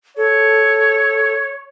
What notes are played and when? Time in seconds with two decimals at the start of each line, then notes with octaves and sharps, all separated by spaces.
0.17 A4 C#5